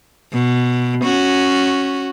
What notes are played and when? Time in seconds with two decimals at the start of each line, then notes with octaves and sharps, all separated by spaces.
0.33 B2
1.04 C#4 F#4